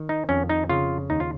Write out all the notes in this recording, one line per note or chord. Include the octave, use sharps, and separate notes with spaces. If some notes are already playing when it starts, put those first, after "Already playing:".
Already playing: D#3
D#4
F2 C#4
D#4
C#3 F4
D#2 D#4
F4